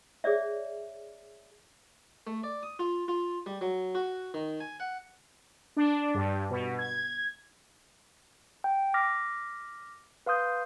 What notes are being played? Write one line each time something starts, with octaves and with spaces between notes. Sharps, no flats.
G#4 C#5 D5 E5
A3
D5
D#6
F4
F4
G3
F#3
F#4
D#3
G#5
F#5
D4
G2
B2
G#6
G5
D6 F6 A#6 B6
B4 F5 C6 D#6 G6